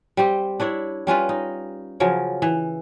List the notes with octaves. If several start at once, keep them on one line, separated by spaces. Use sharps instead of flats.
G3 C4 G4
D4 E4 C#5
G3 C#4 F4 B4
D#4
C#3 F3 F#3 A#4
E3